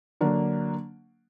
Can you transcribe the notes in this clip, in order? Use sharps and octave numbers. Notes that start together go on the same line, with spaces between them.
D3 F#3 A#3 D4